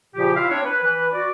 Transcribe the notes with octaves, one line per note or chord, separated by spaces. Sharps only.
A#2 C#3 F3 G4
E4 F4 E5 F5
C4 D4 C#5
B4
E3 B4
F#4 D5